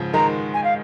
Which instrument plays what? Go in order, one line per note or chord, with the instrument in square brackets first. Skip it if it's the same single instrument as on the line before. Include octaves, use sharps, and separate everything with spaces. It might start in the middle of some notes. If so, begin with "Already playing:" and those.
Already playing: [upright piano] G#2 C#3 F3
[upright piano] D#3 G#3 [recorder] A#5
[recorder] G#5
F5